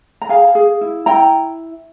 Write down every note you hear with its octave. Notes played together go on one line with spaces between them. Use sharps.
A#5
G#4 F5 G#5
G#4
E4
E4 G5 A#5